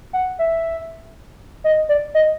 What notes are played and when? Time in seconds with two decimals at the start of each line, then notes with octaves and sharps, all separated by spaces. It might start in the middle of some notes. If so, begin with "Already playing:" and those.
0.13 F#5
0.39 E5
1.64 D#5
1.89 D5
2.14 D#5